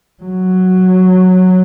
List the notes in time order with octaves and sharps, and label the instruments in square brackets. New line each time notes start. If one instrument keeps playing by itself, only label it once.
[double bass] F#3